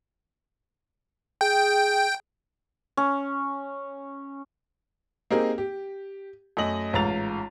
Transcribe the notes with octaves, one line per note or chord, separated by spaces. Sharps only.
G#4 G5
C#4
A#3 C4 D#4 G4 G#4 A#4
G4
F#2 A3 D#5 F#7
A1 G#2 F4 A#5 A6 F7